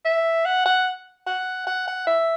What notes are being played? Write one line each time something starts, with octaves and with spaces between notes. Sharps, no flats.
E5
F#5
F#5
F#5
F#5
F#5
E5